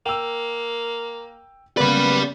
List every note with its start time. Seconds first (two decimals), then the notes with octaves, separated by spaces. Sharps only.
0.06 A#3 G5 E6
1.77 C#3 A#3 B3 B4 D5 B5